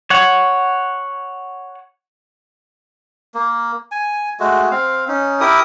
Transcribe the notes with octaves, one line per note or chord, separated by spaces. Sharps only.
C#5 F#5
A#3
G#5
G#3 A3 F#4
C4 F5
C#4 D#4
E4 G4 A#4 D#6